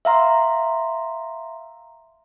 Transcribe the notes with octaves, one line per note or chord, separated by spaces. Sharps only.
E5 F5 A#5 C6